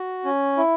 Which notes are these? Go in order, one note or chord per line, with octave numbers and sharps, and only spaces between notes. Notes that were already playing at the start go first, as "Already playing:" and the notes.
Already playing: F#4
C#4
E4